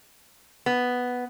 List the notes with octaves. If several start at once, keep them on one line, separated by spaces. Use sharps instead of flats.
B3